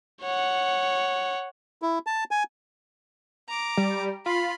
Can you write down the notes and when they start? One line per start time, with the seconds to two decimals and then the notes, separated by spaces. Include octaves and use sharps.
0.22 C#5 F#5
1.82 E4
2.07 A5
2.31 G#5
3.49 A#5 D6
3.77 G3
4.26 F4 B5 C6